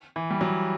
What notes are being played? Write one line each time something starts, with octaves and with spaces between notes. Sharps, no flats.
E3
G3
F#3